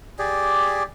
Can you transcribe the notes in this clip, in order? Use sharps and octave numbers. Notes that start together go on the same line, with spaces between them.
G4 G#4 D5